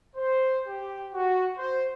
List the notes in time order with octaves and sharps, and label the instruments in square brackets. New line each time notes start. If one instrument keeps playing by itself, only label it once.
[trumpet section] C5
G4
F#4
C5